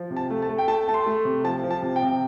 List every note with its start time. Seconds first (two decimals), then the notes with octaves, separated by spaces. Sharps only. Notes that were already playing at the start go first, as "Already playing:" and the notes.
Already playing: F3
0.10 C3
0.16 A5
0.30 A3
0.42 A5
0.49 A3
0.58 G5
0.68 A3 A5
0.88 A3 A5
0.94 C6
1.06 A3
1.25 C3
1.44 F3 A5
1.64 F3
1.70 A5
1.82 C3
1.96 G5
2.03 C3